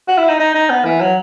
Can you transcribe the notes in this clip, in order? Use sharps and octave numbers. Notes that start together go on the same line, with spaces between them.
F#4
E4
D#4
D#4
D#4
B3
E3
F#3